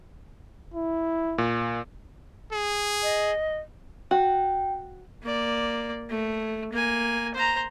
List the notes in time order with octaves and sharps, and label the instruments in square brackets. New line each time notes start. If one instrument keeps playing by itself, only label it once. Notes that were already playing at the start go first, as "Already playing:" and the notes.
[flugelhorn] E4
[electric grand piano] A#2
[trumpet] G#4
[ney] D#5
[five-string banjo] F#4 [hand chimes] G5
[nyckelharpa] A#3 D5
A3
A#3 G#5
C5 A#5